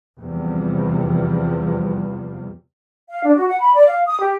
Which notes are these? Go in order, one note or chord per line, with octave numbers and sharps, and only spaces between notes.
E2 C3 F3 G3
F5
D4
F#4
F#5
B5
D5
F5
D#6
G4